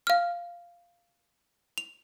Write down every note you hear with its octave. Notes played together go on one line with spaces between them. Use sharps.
F5 F6
F7